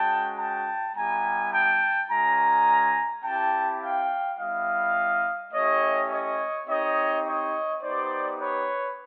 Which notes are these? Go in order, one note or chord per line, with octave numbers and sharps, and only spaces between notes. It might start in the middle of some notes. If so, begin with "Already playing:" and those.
Already playing: G#3 C#4 F#4 G5 A5
G5 A5
G3 B3 E4 G4 G#5 A#5
G5 A5
G#3 C#4 F4 G#5 A#5
C4 E4 G4 G5 A5
F5 G5
G3 B3 E4 D#5 F5
A3 C#4 E4 G4 C#5 D#5
C#5 D#5
C4 D#4 G4 C#5 D#5
C#5 D#5
B3 D#4 G4 C5 D5
B4 C#5